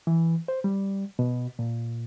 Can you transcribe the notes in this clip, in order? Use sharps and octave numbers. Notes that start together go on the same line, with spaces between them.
E3
C5
G3
B2
A#2